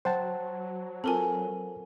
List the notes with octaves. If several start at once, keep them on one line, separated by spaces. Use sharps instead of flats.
F#3 C5 F#5 G5 A5
C4 F4 A4 A#4 G#5